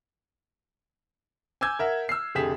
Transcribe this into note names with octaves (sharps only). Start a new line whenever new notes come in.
G#5 D6 E6 G6 G#6
A#4 E5 F#5
E6 F6 C7
F1 D3 G4 G#4 B6 E7